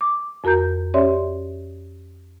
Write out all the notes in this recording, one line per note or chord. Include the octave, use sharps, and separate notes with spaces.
D6
F2 F#4 A#4 A#5 G6
C#4 G4 C#5 D5 E5 C6